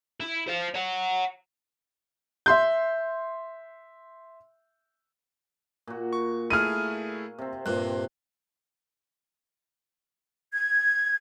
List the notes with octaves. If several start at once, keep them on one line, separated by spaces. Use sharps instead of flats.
E4
C5 F5
C#5 F#5
E5 C6 G6
A#2 F#4
C#6
A3 E4 G#4 F6 D#7
C3 C4
G2 A#2 C4 F#6
G#6